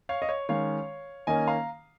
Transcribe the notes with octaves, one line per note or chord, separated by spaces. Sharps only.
C#5 F5
D#5
C#5
D#3 G#3 C#4 C#5 F5
D#3 A#3 C#4 D#5 G#5
F5 A#5